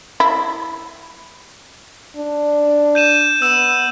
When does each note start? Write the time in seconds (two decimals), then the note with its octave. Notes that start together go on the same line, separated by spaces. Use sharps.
0.20 E4
2.17 D4
2.95 G6 D#7 E7
3.42 B3 E6 E7